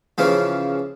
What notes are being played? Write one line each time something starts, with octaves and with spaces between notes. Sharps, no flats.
C#3 E3 F3